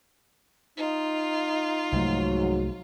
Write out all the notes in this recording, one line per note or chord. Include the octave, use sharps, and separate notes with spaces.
D#4 F4
C2 G#2 F3 F#3 A3